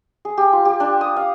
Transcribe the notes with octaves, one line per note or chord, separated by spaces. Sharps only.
G#4
G4
F4
G4
D4
D#6
F5